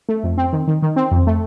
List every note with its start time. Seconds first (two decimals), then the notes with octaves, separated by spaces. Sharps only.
0.09 A3
0.23 F2
0.37 C4
0.53 D#3
0.67 D#3
0.82 D#3
0.96 C4
1.11 F2
1.27 A3